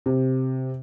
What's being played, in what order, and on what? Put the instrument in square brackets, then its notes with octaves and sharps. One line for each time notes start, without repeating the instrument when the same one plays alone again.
[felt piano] C3